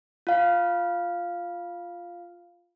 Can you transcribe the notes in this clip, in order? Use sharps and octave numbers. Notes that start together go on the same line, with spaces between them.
F4 F5